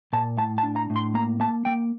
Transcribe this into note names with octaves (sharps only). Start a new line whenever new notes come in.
A#2 A5
A2 A5
A5
D4
A#5
A2
C6
A#3 A#5
A#3 A5
A#3 G5